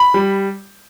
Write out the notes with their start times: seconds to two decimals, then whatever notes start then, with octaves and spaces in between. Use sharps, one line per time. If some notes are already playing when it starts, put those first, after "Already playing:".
Already playing: B5
0.14 G3